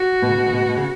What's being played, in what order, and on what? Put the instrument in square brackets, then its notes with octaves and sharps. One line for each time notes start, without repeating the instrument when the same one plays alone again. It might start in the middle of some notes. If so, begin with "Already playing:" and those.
Already playing: [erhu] F#4
[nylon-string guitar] B2
C#3
B2
C#3
B2
C#3
B2
C#3